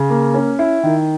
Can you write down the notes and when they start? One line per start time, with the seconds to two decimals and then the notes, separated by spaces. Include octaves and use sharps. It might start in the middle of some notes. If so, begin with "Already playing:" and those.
Already playing: C#3
0.10 A#3
0.34 C#4
0.59 E4
0.83 D#3